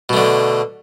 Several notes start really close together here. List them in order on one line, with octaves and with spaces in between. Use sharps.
B2 A3 D3